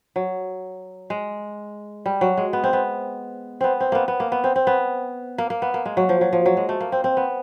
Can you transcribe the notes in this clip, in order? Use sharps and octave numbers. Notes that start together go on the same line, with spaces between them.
F#3
G#3
G3
F#3
G#3
B3
C4
B3
B3 C4
C4
A#3 B3
B3
A#3
B3
C4
C4
B3
A#3
A#3
B3
A#3
G#3
F#3
F3
F#3
F3
F#3
G#3
A3
A#3
C4
C4
B3